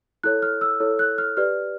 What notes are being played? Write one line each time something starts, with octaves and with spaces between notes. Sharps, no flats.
E4 A4 C#5 F#6
F6
E6
E4 A4 C#5
F#6
F6
G4 B4 D5 F6